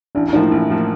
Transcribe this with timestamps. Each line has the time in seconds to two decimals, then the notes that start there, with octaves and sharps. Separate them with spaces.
0.15 A1 D4
0.33 A2 F3 A#3 D#4
0.51 A1 E4
0.70 A2 F3 A#3